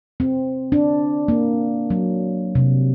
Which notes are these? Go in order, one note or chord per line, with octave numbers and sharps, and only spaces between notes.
C4
D4
A#3
F#3
C3